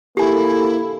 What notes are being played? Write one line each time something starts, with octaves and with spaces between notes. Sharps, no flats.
F2 A2 D3 A#3 E4 G4 G#5